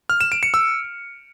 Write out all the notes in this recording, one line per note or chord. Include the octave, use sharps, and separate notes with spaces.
F6
E7
D7
C#7
E6